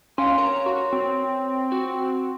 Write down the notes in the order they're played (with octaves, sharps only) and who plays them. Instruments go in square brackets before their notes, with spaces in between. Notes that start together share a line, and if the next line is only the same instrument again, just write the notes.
[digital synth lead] C#4 [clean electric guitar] F5 G#5 [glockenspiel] C6
[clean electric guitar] A#4 C#5 [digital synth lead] A#5
[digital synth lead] F#4
C4
[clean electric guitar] F#4